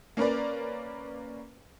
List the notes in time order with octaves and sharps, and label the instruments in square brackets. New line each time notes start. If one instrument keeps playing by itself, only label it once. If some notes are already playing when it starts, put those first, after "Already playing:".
[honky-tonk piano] A#3 C#4 A#4 B4 D5